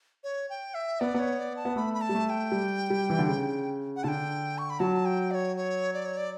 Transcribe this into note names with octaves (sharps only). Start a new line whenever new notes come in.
C#5
G5
E5
B3 D5
B3 C#5
D5
A5
B3
A3 B5
B5
A5
G3
A3
A5
G5
G3
G3
E3
D3
C#3
F#5
D3 G5 A5
C#6
B5
F#3 A5
G5
D5
C#5
C#5
D5
C#5
D5